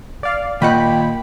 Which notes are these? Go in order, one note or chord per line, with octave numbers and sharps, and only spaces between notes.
D5 F5
A#2 D#3 D#5 F#5 G5 B5